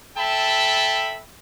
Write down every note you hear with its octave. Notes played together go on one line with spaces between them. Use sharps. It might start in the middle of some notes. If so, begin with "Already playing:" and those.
A4 E5 G5 A5 B5